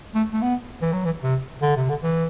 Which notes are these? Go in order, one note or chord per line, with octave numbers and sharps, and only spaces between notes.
A3
A3
B3
E3
F#3
E3
C3
D3
C3
D3
E3